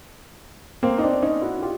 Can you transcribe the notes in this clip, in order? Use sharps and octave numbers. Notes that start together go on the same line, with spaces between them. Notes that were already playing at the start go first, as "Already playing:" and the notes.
A#3 C4
D#4
C4 D4
C#4 D#4
E4 F#4
F4 G4